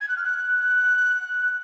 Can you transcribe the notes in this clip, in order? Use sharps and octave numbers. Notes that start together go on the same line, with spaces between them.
G#6
F#6
F6
F#6